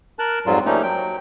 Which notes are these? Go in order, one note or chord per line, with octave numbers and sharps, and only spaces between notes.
A#4 A5 F#6
F2 G#2 F#3 G3 F4
F3 G3 A3 A#3 C#4 D#4
F#3 G5